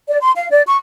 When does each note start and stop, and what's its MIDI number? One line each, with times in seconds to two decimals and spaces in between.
0.09 0.18 74
0.22 0.33 84
0.36 0.49 77
0.52 0.62 74
0.66 0.77 85